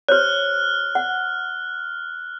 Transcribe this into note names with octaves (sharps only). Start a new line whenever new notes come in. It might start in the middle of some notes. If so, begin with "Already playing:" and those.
G4 C5 C#5 F6 F#6
F#5